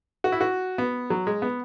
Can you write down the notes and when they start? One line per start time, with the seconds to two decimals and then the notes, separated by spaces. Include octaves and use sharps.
0.24 F#4
0.32 E4
0.41 F#4
0.78 B3
1.10 F#3
1.27 G#3
1.42 B3